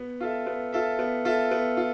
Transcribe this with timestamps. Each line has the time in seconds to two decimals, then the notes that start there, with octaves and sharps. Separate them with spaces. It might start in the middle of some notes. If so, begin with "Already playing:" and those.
Already playing: B3
0.20 F4 A4 E5
0.46 B3
0.73 F4 A4 E5
0.99 B3
1.25 F4 A4 E5
1.51 B3
1.77 F4